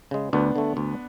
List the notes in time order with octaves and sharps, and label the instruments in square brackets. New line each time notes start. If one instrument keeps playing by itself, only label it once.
[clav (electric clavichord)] C#3 G#3
[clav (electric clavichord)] D2 [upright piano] B3 D4
[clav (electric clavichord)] D3 A3
D2